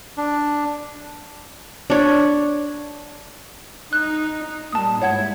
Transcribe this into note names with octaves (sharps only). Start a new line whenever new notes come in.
D4
D4 C#5
D#4 F#6
A#2 G3 A#3 A5 D#6
G#2 E4 C#5 F#5 G#6